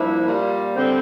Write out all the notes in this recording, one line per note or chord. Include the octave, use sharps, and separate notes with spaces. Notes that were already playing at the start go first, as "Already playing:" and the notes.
Already playing: G2 F3 A#3 E4
A#2 G3 A#3
D3 G3 C4